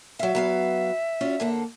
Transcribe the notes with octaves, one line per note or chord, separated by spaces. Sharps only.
F#3 E5 F5
F#3 B3 F5
C#4 F4 F#4
D3 A#3 A4